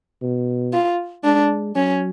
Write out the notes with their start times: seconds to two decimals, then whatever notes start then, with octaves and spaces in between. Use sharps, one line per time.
0.22 B2
0.73 F4
1.24 G#3 D4
1.76 F#3 C#4